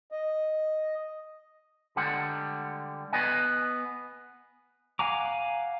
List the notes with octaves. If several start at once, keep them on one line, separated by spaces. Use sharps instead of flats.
D#5
D3 G3 G#3 F#5
B3 D#5 G#5
F5 F#5 G#5 A#5 D6